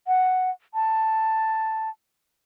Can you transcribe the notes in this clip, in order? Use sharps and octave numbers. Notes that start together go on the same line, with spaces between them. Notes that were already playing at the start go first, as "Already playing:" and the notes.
F#5
A5